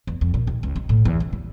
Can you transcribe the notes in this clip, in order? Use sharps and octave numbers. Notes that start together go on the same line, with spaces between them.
E2
F2
A#2
D#2
C#2
D#4
A2
E2
C#3
G3